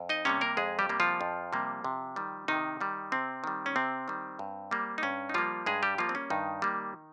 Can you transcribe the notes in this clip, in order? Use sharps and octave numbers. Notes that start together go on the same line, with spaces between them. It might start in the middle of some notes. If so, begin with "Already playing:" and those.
Already playing: F2
D#4 D#5
C3 G3 A#3 C#4 C#5
A#3 A#4
F2 G#3 G#4
G3 G4
C3 G3 A#3
F3 F4
F2
C3 G3 A#3
C3
D#3 G3
C3 D#3 D#4
D#3 G3
C3 C4
D#3 G3
C#4
C3 C4
D#3 G3
G2
G3 A#3
D#4
G2 C#4
D#4
F3 G3 A#3 F4
G2 G#3 G#4
G3 G4
F3 G3 A#3 F4
C4
C#4
G2 D#3 D#4
G3 A#3